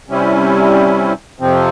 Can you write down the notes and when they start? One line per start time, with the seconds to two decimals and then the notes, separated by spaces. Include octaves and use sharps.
0.09 C3 G3 C#4 E4
1.40 F2 C3 F3 C4